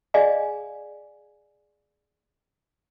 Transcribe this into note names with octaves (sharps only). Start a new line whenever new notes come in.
G#4 D5 D#5 F5 G#5